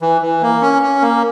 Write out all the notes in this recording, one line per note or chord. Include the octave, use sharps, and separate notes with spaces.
E3
E3
A#3
C#4
C#4
A#3